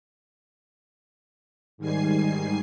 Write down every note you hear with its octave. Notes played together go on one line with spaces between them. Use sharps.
G#2 D#3 G3 G#5 C7